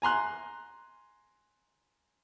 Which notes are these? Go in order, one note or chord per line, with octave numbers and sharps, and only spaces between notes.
G#5 A#5 C6 F#6